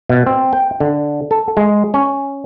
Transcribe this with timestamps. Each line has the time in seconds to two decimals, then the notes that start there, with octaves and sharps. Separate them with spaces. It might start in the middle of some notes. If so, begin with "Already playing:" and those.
0.09 B2
0.27 C4
0.53 G5
0.80 D3
1.31 A4
1.57 G#3
1.94 C#4